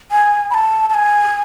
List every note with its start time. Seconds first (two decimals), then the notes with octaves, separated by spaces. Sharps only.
0.11 G#5
0.50 B5
0.54 A5
0.90 A5
0.94 G#5